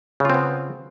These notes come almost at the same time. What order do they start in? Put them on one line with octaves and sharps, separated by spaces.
C#3 F4 C4 B3